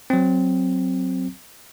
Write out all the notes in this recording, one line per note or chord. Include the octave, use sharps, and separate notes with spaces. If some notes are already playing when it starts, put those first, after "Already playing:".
F#3 C4